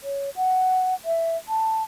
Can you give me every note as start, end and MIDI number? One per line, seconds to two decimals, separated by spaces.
0.03 0.30 73
0.36 0.94 78
1.05 1.37 76
1.48 1.83 81